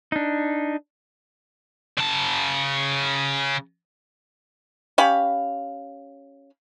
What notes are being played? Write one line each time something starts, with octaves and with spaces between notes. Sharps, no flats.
D4 D#4
C#3 A5
C#4 G4 F5 B5